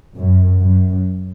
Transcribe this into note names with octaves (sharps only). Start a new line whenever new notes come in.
F#2
F#2